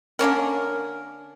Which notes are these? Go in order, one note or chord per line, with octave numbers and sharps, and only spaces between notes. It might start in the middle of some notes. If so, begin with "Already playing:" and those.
D3 A#3 C#4 A#4